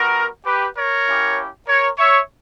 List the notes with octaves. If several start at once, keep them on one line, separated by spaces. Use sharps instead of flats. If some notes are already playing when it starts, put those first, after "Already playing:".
Already playing: G3 B3 F#4 A#4
G4 B4
A#4 C#5
A#3 C#4 E4 G4
A#4 C#5
C#5 E5